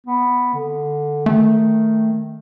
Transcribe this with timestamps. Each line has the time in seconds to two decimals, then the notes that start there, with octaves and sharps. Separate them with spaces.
0.07 B3
0.54 D3
1.26 D#3 A3